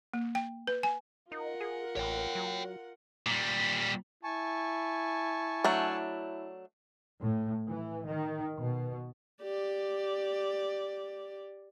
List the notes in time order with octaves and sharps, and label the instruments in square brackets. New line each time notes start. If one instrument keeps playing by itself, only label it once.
[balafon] A#3
G5
B4
G#5
[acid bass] D#4 [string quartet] F4 A#4 F#5
[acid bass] G#4
[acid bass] A1 [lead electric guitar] C#5 G5
[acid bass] F#3
[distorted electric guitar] A#2 G3
[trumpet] E4 [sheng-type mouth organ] G#5 A5 C#6
[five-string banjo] F#3 A3 D4
[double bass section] A2
E3
D#3
B2
[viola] G4 D5